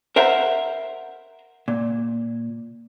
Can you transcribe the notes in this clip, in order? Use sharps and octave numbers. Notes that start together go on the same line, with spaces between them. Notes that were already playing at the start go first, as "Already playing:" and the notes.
A#4 C5 E5 F#5 A#5
A#2